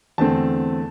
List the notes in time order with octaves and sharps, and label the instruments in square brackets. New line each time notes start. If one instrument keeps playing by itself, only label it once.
[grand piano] E2 D3 A3 C4 A5